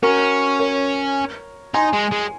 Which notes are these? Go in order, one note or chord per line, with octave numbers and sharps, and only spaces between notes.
C#4 F#4 A#4
A#4 C#5
D#4 G#5 C6
G#3
G#3